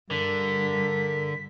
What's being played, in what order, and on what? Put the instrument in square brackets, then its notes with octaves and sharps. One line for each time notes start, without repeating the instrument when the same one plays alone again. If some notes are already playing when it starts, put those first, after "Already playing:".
[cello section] G2 [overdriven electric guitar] D3 [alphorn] A#4 [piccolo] B6